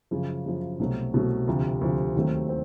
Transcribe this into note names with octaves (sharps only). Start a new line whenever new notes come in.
F#2 C#3 F3
F#2 C#3 F3
C2 B2 F#3 A3 C4
C2 B2 F#3 A3 C4
D2 C3 F3
D2 C3 F3
D#2 D#3 F#3 A3 C4
C4